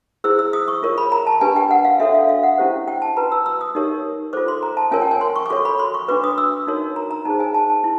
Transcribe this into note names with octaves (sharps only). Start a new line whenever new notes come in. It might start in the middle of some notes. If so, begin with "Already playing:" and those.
E4 G#4 C5 E6
E6
D#6
C#6
F4 A#4 C#5
B5
A#5
A5
D4 G4 B4 G#5
G5
F#5
F5
D4 F#4 A4 C#5 E5
F5
F5
F#5
C#4 E4 G4 C5
G5
A5
F#4 B4 A#5
E6
E6
D#6
D#4 G4 A#4 C#5
F4 A4 C5 D6
C6
A#5
A5
C#4 F4 A#4 C#5 G#5
G5
G#5
C6
C#6
D6
F#4 A4 C#5 C#6
B5
C6
C#6
D4 F#4 B4 D6
D#6
E6
D#4 F#4 A#4 C#5
A#5
A#5
D#4 G#4 C5 A5
G#5
A5
A5
E4